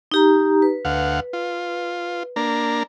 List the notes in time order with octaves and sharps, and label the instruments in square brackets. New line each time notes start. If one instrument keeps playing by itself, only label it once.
[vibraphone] D#4 G4 A#5
B4
[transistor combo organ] D2 F5 F#5
F4
A#3 D4 A#5